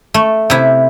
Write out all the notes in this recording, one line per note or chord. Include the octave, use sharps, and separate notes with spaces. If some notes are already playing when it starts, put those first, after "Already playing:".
A3
C3 E4